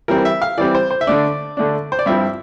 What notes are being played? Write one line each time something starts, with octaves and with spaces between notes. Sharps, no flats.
E3 G3 C4 A#4
E5
F5
E3 G3 C4 D5
C5
C5
E5
D3 A3 D4 D5
D3 A3 D4
C5
D5
G2 F3 C4 E4 E5